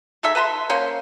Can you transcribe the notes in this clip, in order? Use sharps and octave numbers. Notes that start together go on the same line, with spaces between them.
G#3 D#4 A4 E5
B4 A5 A#5 C6
A#3 C#4 C5